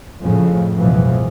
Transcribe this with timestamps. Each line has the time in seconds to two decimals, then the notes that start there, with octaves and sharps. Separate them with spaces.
0.22 F2 A2 C#3 F3
0.76 C#2 F#2 B2 E3 F3